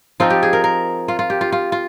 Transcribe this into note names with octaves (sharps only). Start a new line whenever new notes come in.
F3 C4 D#4 F4
G4
G#4
A#4
A#4
F4
F4
G4
F4
F4
F4